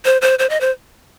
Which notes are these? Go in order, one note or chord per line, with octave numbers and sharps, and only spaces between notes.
C5
C5
C5
D#5
C5